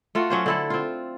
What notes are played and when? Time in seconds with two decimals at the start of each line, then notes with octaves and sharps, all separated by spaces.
0.15 A3 F4 F#4
0.30 F#3 C#4 C5
0.46 D3 E4 A4
0.70 C4 F4